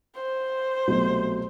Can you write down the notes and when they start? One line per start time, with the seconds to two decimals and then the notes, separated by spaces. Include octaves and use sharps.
0.14 C5
0.88 C2 B2 F#3 A3